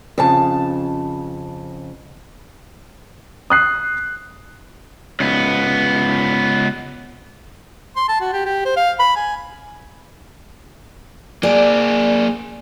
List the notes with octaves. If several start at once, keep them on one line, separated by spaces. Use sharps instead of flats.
F2 C#3 A5
D#6 F#6 C7
C#2 B3
C6
A5
F#4
G4
G4
C5
F5
B5
G#5
A#3 G#4 D5